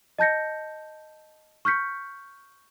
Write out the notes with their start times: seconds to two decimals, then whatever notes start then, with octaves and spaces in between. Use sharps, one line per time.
0.19 D#5 A5 G6 A#6 C#7
1.65 C#6 F6 G6 B6 C#7